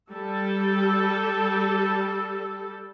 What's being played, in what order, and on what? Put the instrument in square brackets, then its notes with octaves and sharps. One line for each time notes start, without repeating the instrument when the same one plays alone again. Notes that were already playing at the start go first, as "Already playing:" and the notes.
[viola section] G3 A4